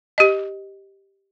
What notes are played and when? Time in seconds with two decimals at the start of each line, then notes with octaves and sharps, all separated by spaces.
0.18 G4 D#5